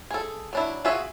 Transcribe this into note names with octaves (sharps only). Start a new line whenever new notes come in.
G#4 A4
F#3 D4 E4
F4 F#4 G#4 E5